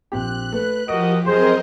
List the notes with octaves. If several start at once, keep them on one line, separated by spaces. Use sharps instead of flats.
A#1 C4 G4 F#6
A3 B4
F3 F#4 G4 A#4 D#5 D7
F#2 C4 G#4 A#4 C5 D#5